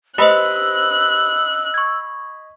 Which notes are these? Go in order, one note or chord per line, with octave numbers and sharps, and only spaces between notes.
G4 B4 C5 D#5 B5 E6 F#6
C#6 G#6